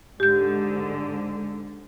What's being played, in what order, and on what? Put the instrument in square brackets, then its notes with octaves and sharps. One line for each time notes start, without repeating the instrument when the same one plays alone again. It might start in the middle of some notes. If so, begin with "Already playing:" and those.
[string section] G#2 D3 [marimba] G4 G6